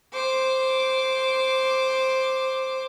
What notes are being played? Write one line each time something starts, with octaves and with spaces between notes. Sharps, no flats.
C5 D6